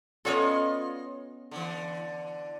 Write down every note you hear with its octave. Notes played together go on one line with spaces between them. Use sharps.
B3 C#4 F4 A4 C#5 D#5
D3 E3